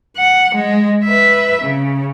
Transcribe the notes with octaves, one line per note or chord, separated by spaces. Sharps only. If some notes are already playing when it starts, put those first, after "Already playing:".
F#5
G#3
B4 E5
C#3